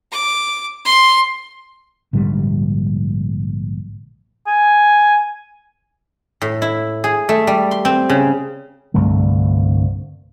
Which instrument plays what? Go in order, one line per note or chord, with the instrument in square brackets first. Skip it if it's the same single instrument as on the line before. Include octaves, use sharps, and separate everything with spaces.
[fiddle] D6
C6
[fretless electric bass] A#1 G#2 D3 G3
[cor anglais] G#5
[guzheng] A2
E4
G#4
A3
G3
C6
C4
C#3
[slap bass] C2 G2 D3 A3